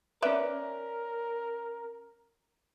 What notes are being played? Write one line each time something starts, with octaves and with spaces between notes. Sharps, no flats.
C#4 A#4 B4 D5 E5